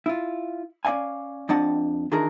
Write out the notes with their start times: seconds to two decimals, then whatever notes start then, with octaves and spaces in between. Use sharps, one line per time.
0.06 E4 F4
0.85 C#4 D5 D#5 F5 G#5
1.49 F2 C4 D4 D#5 F#5 A5
2.12 D#3 E3 D4 F4 G#4 A#4